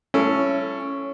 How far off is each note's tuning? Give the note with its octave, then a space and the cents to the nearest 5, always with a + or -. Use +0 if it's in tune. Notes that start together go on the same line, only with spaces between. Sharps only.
C#4 +0 E4 +35 A4 +0